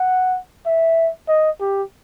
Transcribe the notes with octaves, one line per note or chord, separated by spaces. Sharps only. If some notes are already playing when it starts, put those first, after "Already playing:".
Already playing: F#5
E5
D#5
G4